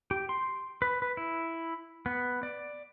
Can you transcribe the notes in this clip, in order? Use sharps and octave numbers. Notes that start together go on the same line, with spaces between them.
G4
C6
B4
B4
E4
B3
D5